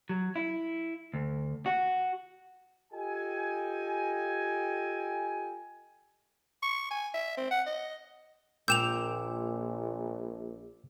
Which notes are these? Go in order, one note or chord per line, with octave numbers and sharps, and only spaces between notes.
F#3
E4
D2
F#4
F4 G4 A4 D#5 G5 G#5
C#6
G#5
E5
C4
F#5
D#5
A#1 A#2 G5 D6 E6 G6 E7 F7